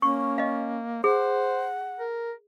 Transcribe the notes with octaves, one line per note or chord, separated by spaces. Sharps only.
A#3 C#4 C#6
D#5 F5
G#4 C5 F#5
A#4